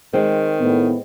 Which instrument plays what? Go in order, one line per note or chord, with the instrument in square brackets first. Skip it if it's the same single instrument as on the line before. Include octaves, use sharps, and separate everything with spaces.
[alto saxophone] D#3 [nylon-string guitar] G#3 C4
[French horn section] A2 B3